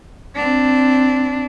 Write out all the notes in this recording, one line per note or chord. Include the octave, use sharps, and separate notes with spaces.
C4 D4